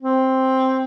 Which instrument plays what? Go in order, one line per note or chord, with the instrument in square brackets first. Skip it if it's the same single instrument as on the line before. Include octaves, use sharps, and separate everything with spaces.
[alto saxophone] C4